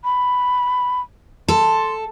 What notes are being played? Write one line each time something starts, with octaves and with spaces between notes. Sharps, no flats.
B5
A4 C6